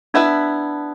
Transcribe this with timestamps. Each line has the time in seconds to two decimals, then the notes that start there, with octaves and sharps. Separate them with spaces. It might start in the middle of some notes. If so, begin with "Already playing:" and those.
0.14 B3 D4 E4 B4